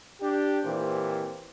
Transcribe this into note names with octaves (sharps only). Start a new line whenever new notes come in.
D4 G4
A#2 E3 C4 G4 C5